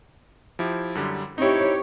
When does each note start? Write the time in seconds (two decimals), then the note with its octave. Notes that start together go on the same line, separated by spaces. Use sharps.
0.59 F3 E4 G4
0.95 F#2 D3 G3
1.38 C4 D#4 E4 G4 C#5